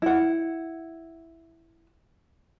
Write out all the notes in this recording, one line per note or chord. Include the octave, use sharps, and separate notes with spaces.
E4 F#5